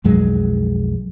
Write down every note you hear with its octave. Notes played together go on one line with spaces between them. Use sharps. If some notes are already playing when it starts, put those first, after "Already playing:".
B1 F2 F#3 G#3